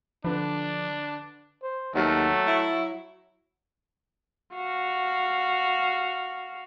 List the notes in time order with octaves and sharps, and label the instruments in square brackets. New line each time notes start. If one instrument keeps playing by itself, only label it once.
[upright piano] D3 B4 [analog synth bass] F3 [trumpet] D4
[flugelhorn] C5
[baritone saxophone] D#2 [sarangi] F#3 [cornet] A3 [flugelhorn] F#5
[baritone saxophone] E4
[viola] F#4 F5